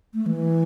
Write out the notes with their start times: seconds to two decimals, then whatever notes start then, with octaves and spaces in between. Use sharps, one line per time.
0.14 A3
0.26 E3